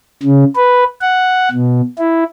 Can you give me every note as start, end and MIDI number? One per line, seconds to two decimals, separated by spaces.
0.23 0.44 49
0.56 0.84 71
1.01 1.49 78
1.51 1.81 47
1.99 2.24 64